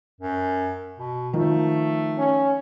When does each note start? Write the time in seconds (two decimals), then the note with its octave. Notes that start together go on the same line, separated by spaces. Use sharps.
0.21 F#2
0.99 B2
1.33 D#3 F3 A3
2.18 C#4